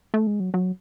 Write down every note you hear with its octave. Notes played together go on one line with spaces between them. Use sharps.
A3
G#3
F#3
F#3